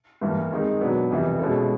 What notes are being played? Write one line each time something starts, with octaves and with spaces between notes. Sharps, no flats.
G2 E3 G3 A#3
D#3 G#3 C4 D#4
B2 F#3 B3 D4
F2 C3 E3 G3
B2 G#3 C#4 E4 A4